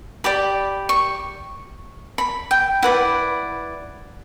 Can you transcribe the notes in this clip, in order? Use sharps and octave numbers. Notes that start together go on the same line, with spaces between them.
G4 D5 B5
C#6
B5
G5
E4 B4 D5 F#5